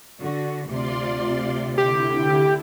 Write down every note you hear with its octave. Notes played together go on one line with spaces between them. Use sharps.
D3 F#4
D2 C3 F4 D5 C6
D3 E4 G4